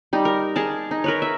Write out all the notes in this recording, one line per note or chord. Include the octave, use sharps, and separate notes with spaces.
G3 D#4
A#4
G#4 A#4 A5
D#4
A#4 B4 C#5
E5